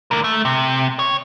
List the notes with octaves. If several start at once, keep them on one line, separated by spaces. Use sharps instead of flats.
D3 A#4
A3
C3
C#5